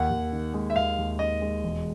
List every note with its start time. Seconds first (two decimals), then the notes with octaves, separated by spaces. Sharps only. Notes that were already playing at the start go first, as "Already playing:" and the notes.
Already playing: D#2 F#5
0.11 D#2
0.33 D#3
0.54 G#3
0.70 E5
0.76 D#2 F5
0.98 D#2
1.19 D#3 D#5
1.41 G#3
1.64 E1